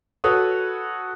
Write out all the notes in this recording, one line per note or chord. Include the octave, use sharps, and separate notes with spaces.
F#4 A4 B4 C#5 D#6